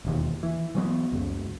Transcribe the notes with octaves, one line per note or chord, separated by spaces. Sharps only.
E1 D#2
E3
E3 F#3 B3
C#2 F#2